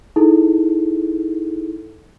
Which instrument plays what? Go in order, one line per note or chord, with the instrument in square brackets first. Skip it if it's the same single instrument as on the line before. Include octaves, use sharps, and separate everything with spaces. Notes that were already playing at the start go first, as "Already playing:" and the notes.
[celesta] D#4 E4 G#4 A4